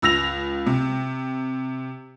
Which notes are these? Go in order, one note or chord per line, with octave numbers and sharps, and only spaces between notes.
C#2 E6 A#6 F7
C3